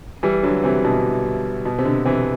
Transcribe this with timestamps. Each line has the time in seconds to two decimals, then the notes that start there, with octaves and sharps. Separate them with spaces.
0.23 E3 G3
0.43 D3 F#3
0.63 C3 E3
0.84 B2 D3
1.65 B2
1.78 C3
1.85 B2 D3
2.05 C3 E3